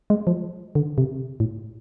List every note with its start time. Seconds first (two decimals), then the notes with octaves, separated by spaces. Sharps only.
0.10 G#3
0.27 F3
0.75 D3
0.98 C3
1.40 A2